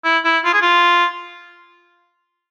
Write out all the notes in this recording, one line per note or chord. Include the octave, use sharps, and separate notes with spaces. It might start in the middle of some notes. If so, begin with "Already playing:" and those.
E4
E4
F4
G#4
F4